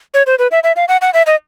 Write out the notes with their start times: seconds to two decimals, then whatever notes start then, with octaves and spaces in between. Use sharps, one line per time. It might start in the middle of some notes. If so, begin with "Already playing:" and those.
0.14 C#5
0.27 C5
0.39 B4
0.51 E5
0.64 E5
0.76 F5
0.88 F#5
1.02 F#5
1.14 E5
1.27 D#5